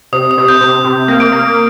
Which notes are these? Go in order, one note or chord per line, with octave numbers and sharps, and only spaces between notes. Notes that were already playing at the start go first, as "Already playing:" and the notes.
C3 D#6
D#6
C3
G6
C3
C3
A#3
D7
A#3